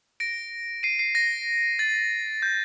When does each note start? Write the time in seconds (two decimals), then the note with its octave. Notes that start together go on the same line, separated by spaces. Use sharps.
0.20 A#6 D7
0.83 C7 D#7
0.99 C7
1.15 A#6
1.79 A6
2.42 G6